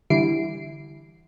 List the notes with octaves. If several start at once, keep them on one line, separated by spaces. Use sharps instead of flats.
D3 E3 G3 E4 C7 D7